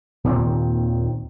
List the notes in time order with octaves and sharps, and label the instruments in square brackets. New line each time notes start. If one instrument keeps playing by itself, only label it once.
[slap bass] D#2 A#2 D#3 C4